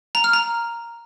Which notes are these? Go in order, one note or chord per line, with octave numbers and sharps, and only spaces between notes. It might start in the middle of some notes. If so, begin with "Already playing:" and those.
A#5
F6
A#5